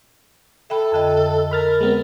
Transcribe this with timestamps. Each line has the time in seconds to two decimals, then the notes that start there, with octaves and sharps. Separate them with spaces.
0.70 A4 E5 G5 B5
0.92 F2 D3 D#5
1.51 A#4 B5 F6 A6
1.81 G#3 B3 C4